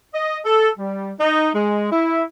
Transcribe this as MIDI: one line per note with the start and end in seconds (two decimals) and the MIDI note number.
0.14 0.39 75
0.45 0.70 69
0.79 1.12 55
1.20 1.50 63
1.55 1.90 56
1.92 2.22 64